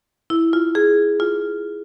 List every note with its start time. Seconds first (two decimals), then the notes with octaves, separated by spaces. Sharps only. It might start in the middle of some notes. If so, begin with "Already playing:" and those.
0.30 E4
0.53 F4
0.75 G#4
1.20 F4